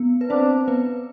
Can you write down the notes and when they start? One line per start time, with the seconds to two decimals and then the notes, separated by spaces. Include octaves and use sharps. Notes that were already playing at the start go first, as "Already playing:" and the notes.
Already playing: B3
0.21 B4
0.30 C4 D4 C5
0.67 B3 B4